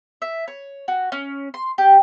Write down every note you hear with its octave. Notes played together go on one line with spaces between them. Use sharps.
E5
C#5
F#4
C#4
C6
G4